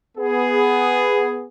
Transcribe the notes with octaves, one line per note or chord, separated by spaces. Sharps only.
B3 G#4